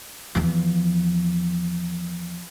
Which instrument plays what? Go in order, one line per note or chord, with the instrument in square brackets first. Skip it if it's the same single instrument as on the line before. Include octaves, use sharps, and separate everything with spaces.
[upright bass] E2 F3